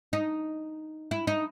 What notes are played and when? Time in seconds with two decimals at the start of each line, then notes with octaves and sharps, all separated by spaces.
0.13 D#4
1.11 E4
1.27 D#4